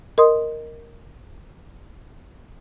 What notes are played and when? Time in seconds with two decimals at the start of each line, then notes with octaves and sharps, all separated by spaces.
0.18 A#4 D#5 C6 D#6